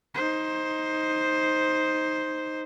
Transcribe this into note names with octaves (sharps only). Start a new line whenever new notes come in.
D#4 C5